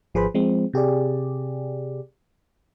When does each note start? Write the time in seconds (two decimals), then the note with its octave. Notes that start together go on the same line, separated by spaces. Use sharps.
0.14 G#1 F3 G#4 B4 C5 B5
0.34 F3 G#3 C4
0.73 C3 G4 G#4 D5